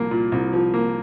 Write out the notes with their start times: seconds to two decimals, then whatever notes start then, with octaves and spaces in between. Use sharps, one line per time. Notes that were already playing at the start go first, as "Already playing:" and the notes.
Already playing: C2 F3 A#3
0.11 A#2
0.32 C2
0.53 F3
0.74 A#3